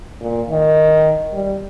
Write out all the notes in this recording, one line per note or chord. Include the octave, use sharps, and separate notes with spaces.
A#2
D#3
G3